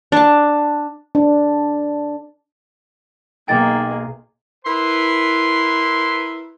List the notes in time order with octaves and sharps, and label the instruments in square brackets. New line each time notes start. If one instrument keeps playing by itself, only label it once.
[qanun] D4 A5
[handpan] D4
[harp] B1 D#4 D7 [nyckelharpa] A#3 G#4 [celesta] G5 A6
[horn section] E4 A#4 B4 [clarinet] C6